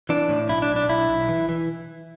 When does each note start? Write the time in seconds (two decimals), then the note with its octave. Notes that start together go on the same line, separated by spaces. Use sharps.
0.09 E3 D4
0.29 A2
0.49 B1 E4
0.62 D4
0.70 B1
0.76 D4
0.89 B1 E4
1.09 B1
1.29 E3
1.49 E3